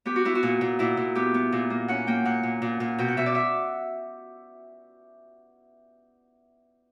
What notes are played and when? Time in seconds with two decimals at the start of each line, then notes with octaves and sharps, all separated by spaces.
0.06 B3 G4
0.16 F#4
0.25 B3 E4
0.35 F#4
0.43 A#2
0.61 A#2
0.79 A#2 E4
0.97 A#2
1.15 B3 G4
1.34 B3
1.52 A#2
1.70 A#3
1.88 C#4 F#5
2.07 A#3 G5
2.25 A#2 F#5
2.43 A#2
2.62 A#2
2.80 A#2
2.98 B2 G5
3.08 F#5
3.17 B2 E5
3.26 D5
3.35 E5